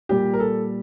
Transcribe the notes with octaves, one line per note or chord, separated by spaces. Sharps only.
A#2 G3 G4
A#4
A4